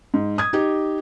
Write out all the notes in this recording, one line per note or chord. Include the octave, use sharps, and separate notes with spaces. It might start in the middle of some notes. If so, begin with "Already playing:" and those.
G#2
D#6 G#6
D#4 G4